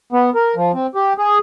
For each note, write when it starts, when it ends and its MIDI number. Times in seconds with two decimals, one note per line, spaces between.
0.13 0.30 59
0.35 0.55 70
0.56 0.72 53
0.74 0.87 60
0.95 1.13 67
1.18 1.38 68